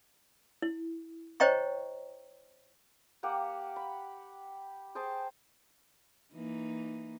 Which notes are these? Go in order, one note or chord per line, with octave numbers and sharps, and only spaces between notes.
E4
C5 C#5 D#5 G5 A#5 C#6
A#3 G4 F#5
B5
G#4 C5 G5 A5
E3 A#3 D#4